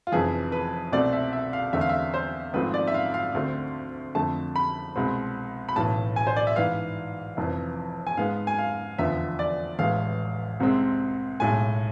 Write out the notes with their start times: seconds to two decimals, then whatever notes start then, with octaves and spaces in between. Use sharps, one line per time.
0.07 F4
0.12 F1 F2 E3 G#4
0.52 B4
0.92 C2 B2 A3 C4 D5
1.13 E5
1.33 E5
1.53 F5
1.73 E2 D3 A3 C4 E5
1.81 F5
1.89 E5
2.14 C5
2.53 G#1 G#2 F3 A3 C4 B4
2.74 D5
2.87 E5
2.94 F5
3.14 F5
3.35 D2 D3 A3 C4
4.15 F2 D3 A3 A5
4.56 B5
4.96 C2 B2 G#3 C4
5.69 B5
5.76 B1 A2 E3 A5
6.16 G#5
6.27 C5
6.36 D5
6.47 E5
6.56 G#2 E3 B3 F5
7.37 F1 F2 E3
8.07 G#5
8.17 G#2 G#3 B3 F5
8.47 G#5
8.59 F5
8.98 F1 E2 D3 F3 B3 E5
9.39 D5
9.79 A1 A2 E3 G#3 F5
10.60 C2 C3 G#3 C4
11.40 B1 A2 G#3 G#5